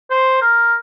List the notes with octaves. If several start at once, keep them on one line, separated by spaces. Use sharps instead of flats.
C5
A#4